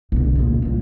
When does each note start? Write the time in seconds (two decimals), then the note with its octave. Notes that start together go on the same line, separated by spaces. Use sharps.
0.12 B1 D3
0.35 C#2 A#2
0.62 A#2 G3